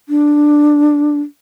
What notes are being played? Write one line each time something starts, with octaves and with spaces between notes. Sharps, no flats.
D4